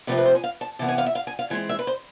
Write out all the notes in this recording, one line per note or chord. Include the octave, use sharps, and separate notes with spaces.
C3 F3 A3 C4 B4
B4
C5
G#5
F5
A5
C3 E3 B3 A5
G#5
F5
E5
F5
G#5
F5
E3 G#3 C4 G#5
E5
B4
C5